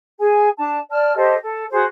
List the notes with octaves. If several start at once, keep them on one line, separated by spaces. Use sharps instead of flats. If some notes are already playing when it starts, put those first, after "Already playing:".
G#4 G#5
D4 A5
D5 A5 F6
G4 A4 C5 D#5
A4
F#4 G#4 C5